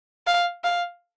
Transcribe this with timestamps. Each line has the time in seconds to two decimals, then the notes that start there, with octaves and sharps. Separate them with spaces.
0.27 F5
0.64 F5